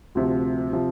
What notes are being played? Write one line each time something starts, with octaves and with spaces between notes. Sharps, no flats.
D2 C3 F3
C3 F3